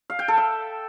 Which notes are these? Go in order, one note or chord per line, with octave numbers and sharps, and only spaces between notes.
F5
G5
A4
E5